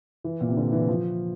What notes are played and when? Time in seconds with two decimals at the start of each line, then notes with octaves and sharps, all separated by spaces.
0.24 E3
0.41 A#2
0.49 C3
0.57 D3
0.72 E3
0.89 F3